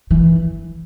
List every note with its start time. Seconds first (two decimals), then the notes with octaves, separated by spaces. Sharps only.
0.11 E3